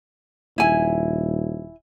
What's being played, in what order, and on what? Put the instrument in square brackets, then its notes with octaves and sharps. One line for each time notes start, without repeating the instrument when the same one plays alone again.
[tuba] D#1 [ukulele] E4 G#5